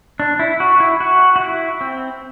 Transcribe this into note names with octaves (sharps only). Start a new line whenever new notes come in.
D4
E4
F#4
E4
F#4
F#4
E4
C4